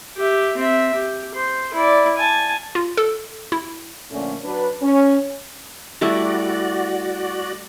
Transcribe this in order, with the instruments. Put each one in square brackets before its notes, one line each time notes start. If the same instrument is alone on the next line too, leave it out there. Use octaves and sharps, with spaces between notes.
[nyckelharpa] G4 E5
C4 E5
G4
C5
E4 D5
G#5 A5
[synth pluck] F4
A4
E4
[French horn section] A#2 D3 F3 A3 C#4
F#3 D4 B4
C#4
[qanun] G3 A3 E4 [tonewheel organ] F#4 D5